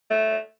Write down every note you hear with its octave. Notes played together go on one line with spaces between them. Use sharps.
A3